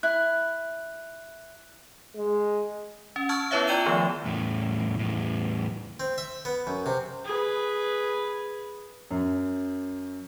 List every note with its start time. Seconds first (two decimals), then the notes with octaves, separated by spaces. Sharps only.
0.03 E4 F#6
2.15 G#3
3.16 C#4
3.29 A5 C#6 E6 F6 G#6
3.51 B3 E4 B4 C#5 E5 F5
3.67 F4 D5 G5 D#7 E7 G7
3.86 D#3 F3 A3 B3
4.26 E2 A2
4.99 E2 A2
6.00 C4
6.18 E5
6.45 B3
6.67 F#2
6.86 C3
7.25 G#4 B4
9.11 F#2